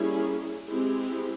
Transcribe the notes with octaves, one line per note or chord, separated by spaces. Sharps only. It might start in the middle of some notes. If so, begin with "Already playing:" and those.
Already playing: G3 A#3 C#4 E4 G#4
G#3 C4 E4 G4